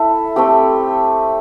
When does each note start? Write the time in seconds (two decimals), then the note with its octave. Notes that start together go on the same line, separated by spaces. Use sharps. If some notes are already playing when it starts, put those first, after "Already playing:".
Already playing: E4 A4 E5
0.36 A3 C4 G4